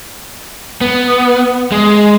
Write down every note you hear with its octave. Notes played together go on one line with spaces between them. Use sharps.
B3
G#3